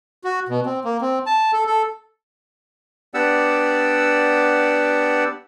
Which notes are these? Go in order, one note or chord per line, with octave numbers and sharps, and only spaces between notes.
F#4
B2
C4
A#3
C4
A5
A4
A4
B3 D4 G4 D5 F#5 E6